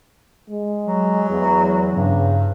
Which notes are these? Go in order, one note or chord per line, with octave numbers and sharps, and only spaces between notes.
G#3
F#3
E2
G2 C#3